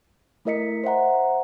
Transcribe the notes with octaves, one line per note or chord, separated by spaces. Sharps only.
A3 E4 A#4 D#5 B6 C#7
C5 E5 F#5 A#5